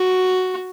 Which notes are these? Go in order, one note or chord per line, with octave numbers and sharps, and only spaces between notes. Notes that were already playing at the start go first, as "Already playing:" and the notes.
Already playing: F#4